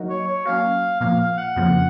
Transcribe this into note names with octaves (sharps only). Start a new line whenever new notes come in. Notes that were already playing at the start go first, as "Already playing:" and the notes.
Already playing: F#3 A#3 D#4 F#4 A#4
C#5
C#5
F#3 A#3 C#4 F5
A#2 F3 A#3 F5
F5
F#5
F2 C#3 F3 A#3